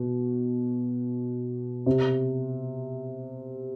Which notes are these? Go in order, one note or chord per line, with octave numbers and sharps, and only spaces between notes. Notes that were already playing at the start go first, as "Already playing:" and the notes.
Already playing: B2
C3